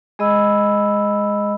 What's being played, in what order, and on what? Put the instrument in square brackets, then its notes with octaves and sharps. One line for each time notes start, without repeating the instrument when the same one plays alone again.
[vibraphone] G#3 G#4 D#5 B5 E6